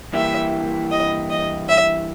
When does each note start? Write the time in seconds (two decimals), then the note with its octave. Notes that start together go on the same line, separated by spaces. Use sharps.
0.13 G2 E3 A#3 E4 G4 E5
0.91 D#5
1.30 D#5
1.68 E5